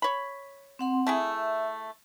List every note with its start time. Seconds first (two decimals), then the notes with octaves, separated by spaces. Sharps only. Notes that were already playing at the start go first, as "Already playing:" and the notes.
0.02 C#5 B5
0.79 C4 F#5 C6
1.07 A3 E4 G#4 E5